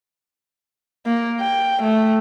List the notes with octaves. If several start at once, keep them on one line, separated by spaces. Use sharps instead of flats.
A#3
G5
A3